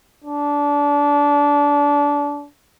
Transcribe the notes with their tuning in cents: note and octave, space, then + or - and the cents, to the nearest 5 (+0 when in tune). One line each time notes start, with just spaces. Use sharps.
D4 -25